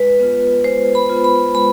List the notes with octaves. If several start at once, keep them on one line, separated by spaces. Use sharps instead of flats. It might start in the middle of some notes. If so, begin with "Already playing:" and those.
Already playing: G#3 B4
B3 F4
G#3 C5
B5
B3 F4
B5
G#3 B5